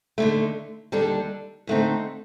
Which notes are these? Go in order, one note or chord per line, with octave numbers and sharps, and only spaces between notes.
D#2 D3 A3
D#2 D3 G3 D4 A4
D#2 D3 A3 C4 D#4